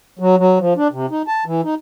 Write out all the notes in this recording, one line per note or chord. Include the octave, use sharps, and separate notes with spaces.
F#3
F#3
F3
D4
C3
D#4
A5
E3
D#4